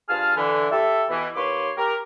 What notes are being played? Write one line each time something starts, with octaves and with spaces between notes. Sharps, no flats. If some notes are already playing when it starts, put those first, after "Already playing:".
G2 F4 G#4 A5 F6
D3 E3
E4 G4 A4 E5
B2 E3
D#2 A#3 B4 C#5 C6 D6
G4 A#4